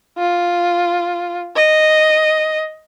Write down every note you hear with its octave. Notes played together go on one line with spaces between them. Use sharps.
F4
D#5